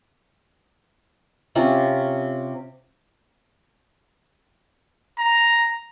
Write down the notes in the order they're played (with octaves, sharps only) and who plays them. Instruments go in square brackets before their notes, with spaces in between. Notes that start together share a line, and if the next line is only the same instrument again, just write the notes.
[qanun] C3 C4 C#4 F4
[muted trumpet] A#5